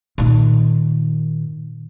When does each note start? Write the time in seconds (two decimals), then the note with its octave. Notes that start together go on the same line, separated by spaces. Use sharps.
0.18 A#2 D#3